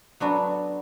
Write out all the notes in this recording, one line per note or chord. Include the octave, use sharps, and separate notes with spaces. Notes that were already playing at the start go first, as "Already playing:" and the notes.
F#3 B3 D4 F#4 A4